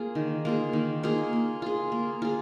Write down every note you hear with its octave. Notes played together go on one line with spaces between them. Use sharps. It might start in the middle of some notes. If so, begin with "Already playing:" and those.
Already playing: A#3 F4 G#4
D#3
A#3 F4 G#4
D#3
A#3 F4 G#4
A#3
F4 G#4
A#3
F4 G#4